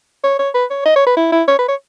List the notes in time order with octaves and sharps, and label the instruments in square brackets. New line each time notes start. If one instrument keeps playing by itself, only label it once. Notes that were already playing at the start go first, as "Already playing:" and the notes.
[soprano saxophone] C#5
C#5
B4
C#5
D#5
C#5
B4
E4
E4
C#5
B4
C#5